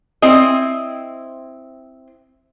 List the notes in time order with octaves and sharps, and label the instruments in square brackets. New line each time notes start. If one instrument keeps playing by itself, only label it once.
[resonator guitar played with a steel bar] C4 E4 D#5